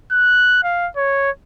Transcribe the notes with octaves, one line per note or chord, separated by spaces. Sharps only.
F#6
F5
C#5